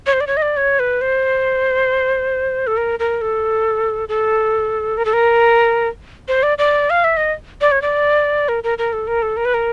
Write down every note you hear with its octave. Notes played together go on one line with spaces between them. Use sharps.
C#5
C5
D5
C#5
D#5
D5
C#5
B4
C5
A4
A#4
A#4
A4
A4
A#4
A4
A#4
C5
D5
D5
F5
E5
D#5
D5
C#5
D5
A#4
A#4
A#4
A4
A#4
A4
A#4
B4
A#4